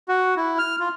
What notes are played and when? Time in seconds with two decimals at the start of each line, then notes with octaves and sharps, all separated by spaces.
0.08 F#4
0.37 E4
0.58 F6
0.80 F4